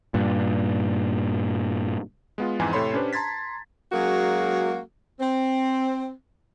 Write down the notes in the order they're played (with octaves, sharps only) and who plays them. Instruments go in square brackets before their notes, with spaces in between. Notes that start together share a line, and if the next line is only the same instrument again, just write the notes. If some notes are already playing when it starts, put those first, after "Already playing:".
[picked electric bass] G2 A#2
[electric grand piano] G#3 B3 F4
F2 G#2 E3 G#5
A2 C3 A4 C#5 B5 C6
C#4 D4 G4 B4 C5
A5 A#5 C6 G#6 A6 B6
[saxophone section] F#3 G#3 A#3 C#4 F#4 G#4
C4